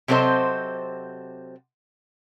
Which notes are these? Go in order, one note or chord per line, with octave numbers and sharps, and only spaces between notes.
C3 F#3 C4 A4 C5 D#5